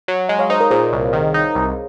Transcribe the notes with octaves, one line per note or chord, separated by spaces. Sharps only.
F#3
G#3 D#5 F#5
C#5 F5
D#4 C5 D#5
A#4 C#5
A#2 G#4 C5
C2
D#3
D#4
C2